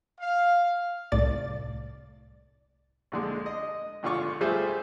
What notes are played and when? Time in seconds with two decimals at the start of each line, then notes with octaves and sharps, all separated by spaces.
0.19 F5
1.12 C2 A2 D5 A6
3.12 A#1 D3 G#3
3.46 D#5
4.03 G#1 D3 F4 C#6
4.41 G3 A3 F4 G#4 C5 E5